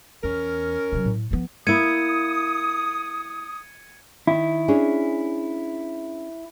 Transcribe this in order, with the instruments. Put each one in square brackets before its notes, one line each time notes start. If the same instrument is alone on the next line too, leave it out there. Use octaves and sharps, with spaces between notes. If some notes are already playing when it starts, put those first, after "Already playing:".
[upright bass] E2 [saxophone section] C#4 A#4
[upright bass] C3 F#3
A2
F3 B3
[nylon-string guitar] A#3 E4 [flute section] D#6 [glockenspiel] G#6 C#7 D#7
[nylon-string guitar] D#3 [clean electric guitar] E4
[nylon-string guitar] C#4 D4 G#4